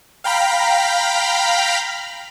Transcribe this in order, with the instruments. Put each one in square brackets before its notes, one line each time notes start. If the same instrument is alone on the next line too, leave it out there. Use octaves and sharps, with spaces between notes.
[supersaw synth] F5 G5 A#5 B5 F6 B6